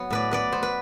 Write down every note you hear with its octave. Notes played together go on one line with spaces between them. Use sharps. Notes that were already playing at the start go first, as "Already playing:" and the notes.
Already playing: F#3 B3
A2 B4 D5
B3 B4 D5
B3 C5
B4